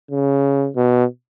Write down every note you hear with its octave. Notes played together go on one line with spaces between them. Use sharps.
C#3
B2